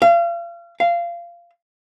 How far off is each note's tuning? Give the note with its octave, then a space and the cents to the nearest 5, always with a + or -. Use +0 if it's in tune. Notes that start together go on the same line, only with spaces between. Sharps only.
F5 -35
F5 -20